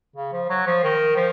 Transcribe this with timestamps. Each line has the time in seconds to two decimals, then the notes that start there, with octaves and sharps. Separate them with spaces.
0.16 C#3
0.33 F3
0.49 F#3
0.67 F3
0.84 D#3
1.16 F3